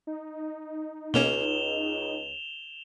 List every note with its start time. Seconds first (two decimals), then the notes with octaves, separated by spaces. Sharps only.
0.07 D#4
1.14 C#2 B2 A#3 C#4 E7 F7 G7